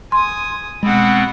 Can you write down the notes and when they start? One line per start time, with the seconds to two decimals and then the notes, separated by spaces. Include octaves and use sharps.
0.12 G#5 C6 D#6
0.83 B2 G#3 B3 C4 F#5 B5